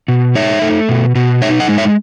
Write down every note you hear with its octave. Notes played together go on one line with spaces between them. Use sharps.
B2
D#4 C#5 E5
A3
B2
B2
D#4 C#5 E5
D#5 F#5
G#3
C#5 E5